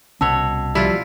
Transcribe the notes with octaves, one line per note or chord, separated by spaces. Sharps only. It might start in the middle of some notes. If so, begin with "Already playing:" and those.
C2 B2 C#4 C#5 A5 E6
F3 G3 E4 F4